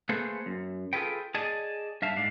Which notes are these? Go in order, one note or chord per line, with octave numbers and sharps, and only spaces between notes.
A3 A#3 G#4 A4 B4 C5
F#2
F4 G#4 A4 B4 G5
G#4 D5 D#5 G#5 A5
G2 E5 F5 A5
G#2 D4 F5